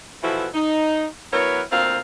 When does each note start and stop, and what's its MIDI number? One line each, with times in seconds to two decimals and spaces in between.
0.23 0.48 47
0.23 0.48 52
0.23 0.48 53
0.23 0.48 64
0.23 0.48 66
0.23 0.48 69
0.54 1.05 63
1.33 1.62 54
1.33 1.62 59
1.33 1.62 64
1.33 1.62 70
1.33 1.62 71
1.33 1.62 73
1.72 1.98 38
1.72 1.98 58
1.72 1.98 60
1.72 1.98 65
1.72 1.98 77